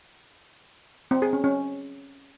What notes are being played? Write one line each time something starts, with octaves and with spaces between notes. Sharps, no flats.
C4
G#4
C#4
C#4